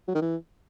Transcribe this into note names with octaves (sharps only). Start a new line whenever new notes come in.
F#3
D#3
E3